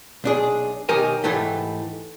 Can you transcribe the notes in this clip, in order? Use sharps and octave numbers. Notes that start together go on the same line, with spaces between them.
B1 D4 G#4
B1 D#3 G4 A#4 D#5 G#5
G#2 E3 A3 G4